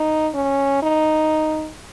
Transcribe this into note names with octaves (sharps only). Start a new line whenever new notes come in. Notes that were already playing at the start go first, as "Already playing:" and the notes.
Already playing: D#4
C#4
D#4